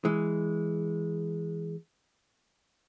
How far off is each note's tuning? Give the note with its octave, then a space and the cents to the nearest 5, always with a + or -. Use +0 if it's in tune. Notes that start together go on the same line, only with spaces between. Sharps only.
E3 +0 G#3 +0